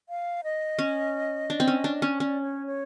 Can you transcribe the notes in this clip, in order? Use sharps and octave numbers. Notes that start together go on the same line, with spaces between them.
F5
D#5
C#4
D4
C4
C#4
D4
C#4
C#4 D5
C#5
C#5